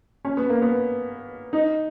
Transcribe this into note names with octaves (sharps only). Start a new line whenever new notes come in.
C#4
B3
A#3
B3
D#4